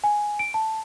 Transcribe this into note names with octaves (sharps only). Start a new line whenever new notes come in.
G#5
D7
A5